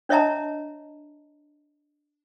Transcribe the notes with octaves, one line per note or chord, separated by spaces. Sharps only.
D4 C#5 D#5 E5 A5 A#5